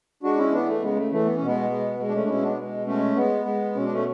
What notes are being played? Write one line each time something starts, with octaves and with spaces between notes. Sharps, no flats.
G#3 D4 F#4
C#4 E4
E3 B3 D4
A3
C#3 G#3 B3
A3
E3 A3
B3
B2 C#4
G#3 B3
G#3
G#3
D4
A3 C#4
D4
B2 C#4 E4
B3 D4
G#3
G#3 A3 C#4
G#3 B3
G#3
B2 C#4
D4
A3 C#4